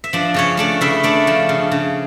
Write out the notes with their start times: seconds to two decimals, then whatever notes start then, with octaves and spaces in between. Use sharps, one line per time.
0.04 E5
0.13 F3 D4 D5
0.34 C#3 C#4 C#5
0.57 A3 D4 D5
0.81 C#3 E4 E5
1.03 A3 D4 D5
1.27 F3
1.49 C#3
1.71 C#3